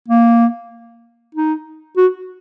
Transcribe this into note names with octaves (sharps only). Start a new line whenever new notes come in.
A#3
D#4
F#4